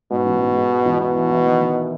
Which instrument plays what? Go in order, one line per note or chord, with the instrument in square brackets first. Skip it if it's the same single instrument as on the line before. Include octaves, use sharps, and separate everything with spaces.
[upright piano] G#2 [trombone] B2
[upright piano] A1
G#2
G#3
G#3
E2
[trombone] B2 [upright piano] E4
[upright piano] E3
E3
D#3
D#3